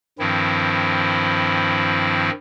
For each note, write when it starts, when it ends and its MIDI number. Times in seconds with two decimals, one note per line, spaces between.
0.19 2.30 43
0.19 2.30 51
0.19 2.30 53
0.19 2.30 60
0.19 2.30 64